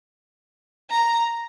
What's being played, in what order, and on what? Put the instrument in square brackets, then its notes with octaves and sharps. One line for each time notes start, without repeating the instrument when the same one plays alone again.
[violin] A#5